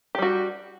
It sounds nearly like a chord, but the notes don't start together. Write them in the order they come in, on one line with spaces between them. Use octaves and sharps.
G4 G3 F#4